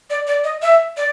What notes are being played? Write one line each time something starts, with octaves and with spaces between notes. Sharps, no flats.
D5
D5
D#5
E5
D5